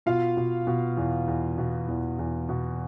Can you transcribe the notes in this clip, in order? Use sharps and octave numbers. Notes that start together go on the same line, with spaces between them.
B2 F4 F5
B2
B2
E2
E2
B2
E2
E2
B2